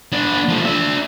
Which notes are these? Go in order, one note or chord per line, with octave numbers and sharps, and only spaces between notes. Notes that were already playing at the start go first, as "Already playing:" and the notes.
B3 D4
F3 A3
D4 E5